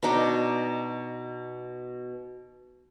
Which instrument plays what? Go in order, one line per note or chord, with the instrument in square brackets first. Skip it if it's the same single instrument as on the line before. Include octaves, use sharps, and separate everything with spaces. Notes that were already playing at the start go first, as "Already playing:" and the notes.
[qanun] B2 D4 D#4 D6